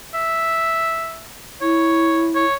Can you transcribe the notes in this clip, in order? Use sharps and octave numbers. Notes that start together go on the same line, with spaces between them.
E5
E4 C#5
C#5